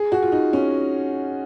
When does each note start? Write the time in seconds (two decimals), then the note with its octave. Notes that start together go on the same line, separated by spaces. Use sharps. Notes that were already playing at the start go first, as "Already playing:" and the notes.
Already playing: G#4
0.12 F#4
0.23 F4
0.32 D#4
0.53 C#4